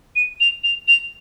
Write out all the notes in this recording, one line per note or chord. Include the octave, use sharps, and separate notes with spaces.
D#7
F7
F7
F7